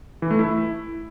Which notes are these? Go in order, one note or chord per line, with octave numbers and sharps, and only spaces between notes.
E3
A3
E4